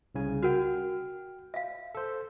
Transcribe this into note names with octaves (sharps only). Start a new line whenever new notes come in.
C2 C#3 G#5
F#4 A#4 F#5 G5 F6
E5 F5
A4 C5